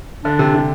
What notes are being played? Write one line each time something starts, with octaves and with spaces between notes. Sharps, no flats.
D3 D4
C3
C3